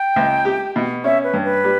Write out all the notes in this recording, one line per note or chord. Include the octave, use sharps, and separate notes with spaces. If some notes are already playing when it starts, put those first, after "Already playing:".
Already playing: G5
C#2
G4
B2
C#4 E5
B4
G2
B4
G3